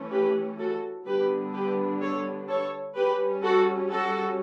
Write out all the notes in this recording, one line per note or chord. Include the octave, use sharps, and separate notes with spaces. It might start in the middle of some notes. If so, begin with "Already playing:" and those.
Already playing: E3 A3 C#4
G4 B4
F#4 A4
D3 G3 B3 D4 G4 B4
G4 B4
A4 C#5
A4 C#5
G3 C#4 G4 B4
F#4 A4
F#4 A4